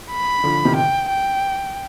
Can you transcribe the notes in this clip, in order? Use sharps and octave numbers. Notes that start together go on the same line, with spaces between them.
B5
D3 F3
C3 D#3
G5
G5